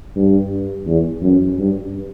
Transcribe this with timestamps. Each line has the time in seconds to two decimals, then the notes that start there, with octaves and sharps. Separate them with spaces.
0.16 G2
0.87 E2
1.22 F#2
1.59 G2